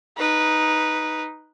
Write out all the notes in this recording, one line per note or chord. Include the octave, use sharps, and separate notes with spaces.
D#4 B4